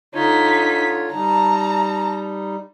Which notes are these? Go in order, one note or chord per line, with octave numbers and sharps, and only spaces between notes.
D3 D#4 F4 C#5 B6
G3 D#4 A5 A#5